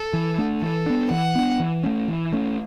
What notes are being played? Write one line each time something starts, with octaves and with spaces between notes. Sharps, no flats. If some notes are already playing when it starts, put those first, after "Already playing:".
Already playing: A4
E3
A3 D4
E3 A4
B3 D4
E3 F#5
B3 D4
E3
A3 C#4
E3
A3 C#4